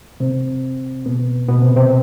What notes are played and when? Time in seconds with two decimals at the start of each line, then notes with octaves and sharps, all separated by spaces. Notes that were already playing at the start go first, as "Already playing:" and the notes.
0.20 C3 C4
1.05 B2 B3
1.48 B2 B3
1.62 C3 C4
1.76 C3 C4